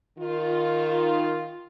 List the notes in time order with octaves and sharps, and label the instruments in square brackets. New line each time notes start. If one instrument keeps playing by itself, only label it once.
[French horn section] D#3 F4